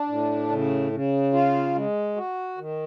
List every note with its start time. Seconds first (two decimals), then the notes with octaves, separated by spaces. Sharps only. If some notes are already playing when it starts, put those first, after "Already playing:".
Already playing: D4
0.08 A2
0.50 C#3
0.92 C#3
1.33 F4
1.75 G#3
2.16 F#4
2.58 D#3